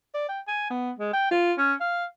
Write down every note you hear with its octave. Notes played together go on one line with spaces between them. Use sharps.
D5
G5
G#5
B3
G#3
G5
F4
C#4
F5